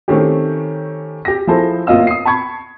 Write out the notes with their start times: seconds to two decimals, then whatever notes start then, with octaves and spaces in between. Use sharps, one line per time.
0.08 D#3 A3 C4 C#4 G4
1.25 G4 A#6
1.47 F3 E4 G#4 A4 C5
1.87 G1 A#3 F4 D#5 F5 E6
2.07 D#6 C7
2.25 A5 B5 C#6 G#6